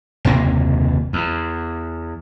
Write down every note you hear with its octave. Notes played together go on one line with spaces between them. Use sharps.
F#1 D#2 C3 A#3
E2